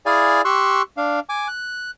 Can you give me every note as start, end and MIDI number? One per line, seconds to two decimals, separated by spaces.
0.06 0.42 64
0.06 0.42 68
0.06 0.42 74
0.06 0.42 77
0.06 0.42 80
0.45 0.82 67
0.45 0.82 84
0.45 0.82 85
0.45 0.82 88
0.45 0.82 90
0.97 1.20 62
0.97 1.20 77
1.29 1.48 80
1.29 1.48 86
1.48 1.91 90